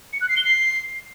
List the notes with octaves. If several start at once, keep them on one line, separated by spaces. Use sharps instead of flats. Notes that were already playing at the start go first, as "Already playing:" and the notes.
C#7
F#6
C7
G7
C7